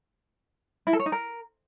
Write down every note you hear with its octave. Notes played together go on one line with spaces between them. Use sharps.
E4
A4
C#5
D#4
A#4